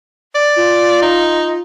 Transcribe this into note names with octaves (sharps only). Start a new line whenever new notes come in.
D5
F4
D#4